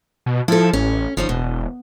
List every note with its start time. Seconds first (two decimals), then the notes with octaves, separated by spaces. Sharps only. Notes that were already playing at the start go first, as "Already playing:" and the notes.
0.26 B2
0.48 F3 E4 A4
0.73 A1 C#4
1.17 G1 F3 C#4 D#4
1.29 E1 B2